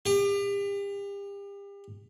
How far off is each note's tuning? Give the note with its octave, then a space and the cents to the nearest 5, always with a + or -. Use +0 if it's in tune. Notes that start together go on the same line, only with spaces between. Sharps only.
G4 +35